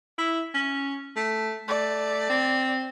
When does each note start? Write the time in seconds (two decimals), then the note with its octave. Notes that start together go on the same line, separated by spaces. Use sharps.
0.18 E4
0.54 C#4
1.16 A3
1.68 A3 D5
2.29 C4